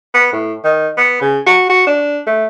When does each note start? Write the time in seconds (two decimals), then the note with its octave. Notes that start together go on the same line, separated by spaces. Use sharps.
0.14 B3
0.33 A2
0.64 D#3
0.97 B3
1.21 C#3
1.46 F#4
1.69 F#4
1.87 D4
2.26 A3